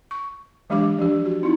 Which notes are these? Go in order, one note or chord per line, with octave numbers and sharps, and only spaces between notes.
C#6
E3 F#3 G#3 D4 G4 D6
F3 D4 G4
F#4
C4 D#4 E4